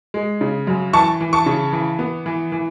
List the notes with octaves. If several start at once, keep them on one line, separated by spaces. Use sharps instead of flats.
G#3
C#3
F#2
E3 A5 C#6
E3
A5 C#6
C#3
E3
B3
E3
E3